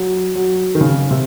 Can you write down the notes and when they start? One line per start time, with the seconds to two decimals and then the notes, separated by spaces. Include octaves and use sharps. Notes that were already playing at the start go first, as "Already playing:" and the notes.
Already playing: F#3
0.35 F#3
0.75 D#3
0.81 C#3
1.11 C3